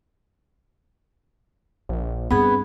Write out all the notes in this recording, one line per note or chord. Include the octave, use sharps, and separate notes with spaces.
A#1
G2 B3 C4 G#4 B5